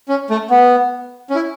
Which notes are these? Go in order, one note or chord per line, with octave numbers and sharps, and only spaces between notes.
C#4
A3
B3
C#4
E4